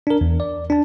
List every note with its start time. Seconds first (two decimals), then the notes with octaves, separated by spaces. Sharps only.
0.07 D4 A#4
0.21 E2
0.40 D5
0.70 D4 A5